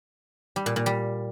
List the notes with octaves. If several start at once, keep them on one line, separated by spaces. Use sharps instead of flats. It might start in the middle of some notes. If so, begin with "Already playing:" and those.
G3
A#2
A#2
G3